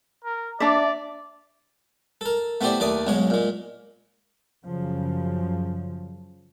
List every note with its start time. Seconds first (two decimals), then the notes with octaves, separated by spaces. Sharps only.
0.24 A#4
0.60 D4 D5 E5
2.21 A4 A#4
2.61 A3 B3 E4 G4 C5 D5
2.80 D#2 A3 D5 D6 D#6
3.07 B1 G#2 G#3 G#4 C#5
3.30 A#2 G#3
4.66 F#2 C#3 F3